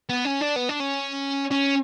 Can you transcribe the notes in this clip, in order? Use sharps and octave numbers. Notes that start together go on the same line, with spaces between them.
B3
C#4
D4
B3
D4
C#4
C#4